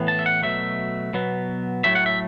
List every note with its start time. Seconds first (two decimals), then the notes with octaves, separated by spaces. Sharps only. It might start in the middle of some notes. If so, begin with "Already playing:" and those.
Already playing: A2 E3 B3
0.08 A5
0.19 E5
0.26 F#5
0.43 B2 F#3 A3 E5
1.13 B2 F#3 B3
1.84 A2 F#3 A3 E5
1.95 F#5
2.06 E5